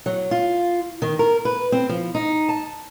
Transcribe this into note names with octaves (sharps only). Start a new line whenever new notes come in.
F#3
F4
D#3
A#4
B4
C4
F3
D#4
A5